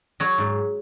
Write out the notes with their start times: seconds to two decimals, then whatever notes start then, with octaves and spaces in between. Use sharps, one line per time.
0.20 F#3 C#5
0.38 G#2